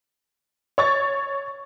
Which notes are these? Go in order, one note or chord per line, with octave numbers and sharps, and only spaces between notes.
C#5 C#6 A6